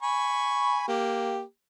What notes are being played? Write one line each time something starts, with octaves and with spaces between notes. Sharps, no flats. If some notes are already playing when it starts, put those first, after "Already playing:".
G#5 B5 C#6
A#3 G4